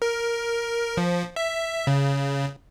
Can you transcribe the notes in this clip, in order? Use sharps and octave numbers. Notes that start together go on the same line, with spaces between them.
A#4
F3
E5
C#3